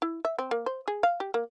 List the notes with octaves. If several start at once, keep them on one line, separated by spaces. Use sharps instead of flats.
E4
E5
C4
A#3
C5
G#4
F5
G4
A#3